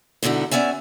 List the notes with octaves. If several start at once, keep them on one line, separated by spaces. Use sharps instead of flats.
G#2 B2 D3 D#4 E4
B3 C#4 D5 E5 G#5